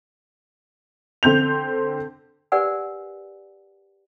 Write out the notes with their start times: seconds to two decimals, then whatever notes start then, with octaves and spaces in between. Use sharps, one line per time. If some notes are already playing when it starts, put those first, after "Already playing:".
1.23 D3 C4 G6 F7
2.52 G4 A#4 B4 D5 F#5 G#5